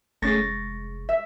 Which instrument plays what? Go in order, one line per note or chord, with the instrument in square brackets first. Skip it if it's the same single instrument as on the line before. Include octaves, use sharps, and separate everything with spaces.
[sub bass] F1 [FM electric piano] A3 C#4 G#4 [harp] C#6 A6 A#6
[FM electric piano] G#3
[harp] E5